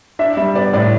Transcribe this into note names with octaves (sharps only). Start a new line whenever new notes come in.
D4 E5
G3 E5
B3 D5
A2 D5